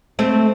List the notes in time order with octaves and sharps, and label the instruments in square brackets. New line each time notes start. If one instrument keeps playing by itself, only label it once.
[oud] A3 C4